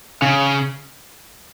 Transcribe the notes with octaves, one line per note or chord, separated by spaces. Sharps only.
C#3